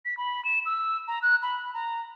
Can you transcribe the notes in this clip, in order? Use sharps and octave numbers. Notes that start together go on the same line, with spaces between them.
B6
B5
E7
E6
A#5
F#6
B5
A#5